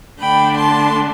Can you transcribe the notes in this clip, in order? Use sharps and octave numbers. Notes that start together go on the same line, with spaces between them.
D3 A3 D4 G5 B5
A5 C6